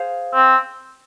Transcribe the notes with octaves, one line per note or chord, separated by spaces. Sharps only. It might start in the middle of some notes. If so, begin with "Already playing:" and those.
Already playing: G#4 C5 F5
C4